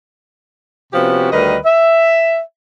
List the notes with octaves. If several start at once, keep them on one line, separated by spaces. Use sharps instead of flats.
C3 F3 B3 C#4 F#4 G4
D2 D#3 G3 A#4 B4 D#5
E5